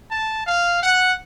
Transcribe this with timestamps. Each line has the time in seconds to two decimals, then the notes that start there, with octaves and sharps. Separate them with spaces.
0.11 A5
0.47 F5
0.83 F#5